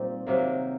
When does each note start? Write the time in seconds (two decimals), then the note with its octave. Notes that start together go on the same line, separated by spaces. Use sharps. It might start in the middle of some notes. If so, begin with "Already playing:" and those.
Already playing: A#2 G3 C4 D#4
0.27 C3 D#3 F#3 A#3